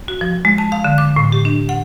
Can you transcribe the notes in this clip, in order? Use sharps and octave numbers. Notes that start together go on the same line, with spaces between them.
F#4
F3
G#3
A5
F5
D3
D6
A2
G4
D4
F#5